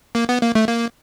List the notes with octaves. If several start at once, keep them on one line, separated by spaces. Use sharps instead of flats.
A#3
B3
A#3
A3
A#3